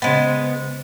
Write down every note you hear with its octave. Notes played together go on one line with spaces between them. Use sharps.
C#3 G#3 B3 C5 A6